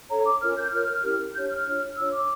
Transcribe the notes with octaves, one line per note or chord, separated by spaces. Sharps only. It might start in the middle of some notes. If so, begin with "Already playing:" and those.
D4 A4 C#5 A#5
D6
C#4 F4 A#4 C#5 F6
G6
F4 A#4 C#5 F6
C#4 E4 G4 A#4
D4 G4 C#5 G6
F6
D4 F4 C#5
D4 F4 C#5 E6
D6